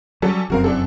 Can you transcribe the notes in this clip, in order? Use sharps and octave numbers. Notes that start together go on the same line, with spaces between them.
F#3 G3 C#4 A4
F1 F#2 C4 F#4 A#4 F5
E3 D4 A4